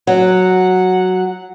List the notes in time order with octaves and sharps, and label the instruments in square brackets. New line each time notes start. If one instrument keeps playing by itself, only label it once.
[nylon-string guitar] F#3 [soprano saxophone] F#5